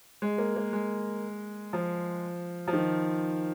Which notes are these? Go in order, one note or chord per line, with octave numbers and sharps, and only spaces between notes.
G#3
A#3
A#3
G#3
F3
F3
D#3